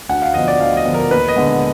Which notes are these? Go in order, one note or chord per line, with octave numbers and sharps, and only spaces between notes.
D2 F#5
F5
D3 F3 B3 D#5
D5
D2 F5
D#5
D3 F3 B3
A#4
D#2 B4
D#5
D3 G#3 B3